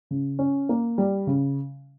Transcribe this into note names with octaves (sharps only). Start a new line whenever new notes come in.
C#3
C#4
A#3
G3
C#3